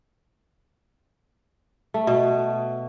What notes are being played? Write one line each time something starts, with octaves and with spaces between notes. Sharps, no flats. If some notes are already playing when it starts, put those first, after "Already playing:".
A3
B2